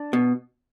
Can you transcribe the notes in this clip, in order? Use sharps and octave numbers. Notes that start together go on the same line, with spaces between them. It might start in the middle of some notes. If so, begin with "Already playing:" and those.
Already playing: D4
B2